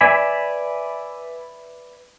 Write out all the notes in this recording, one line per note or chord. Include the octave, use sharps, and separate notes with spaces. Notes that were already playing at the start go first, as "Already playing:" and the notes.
B4 D5 E5 G#5 B5